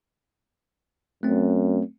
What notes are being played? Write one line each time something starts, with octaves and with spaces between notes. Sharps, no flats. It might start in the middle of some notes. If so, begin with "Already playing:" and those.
F#2 A3 C4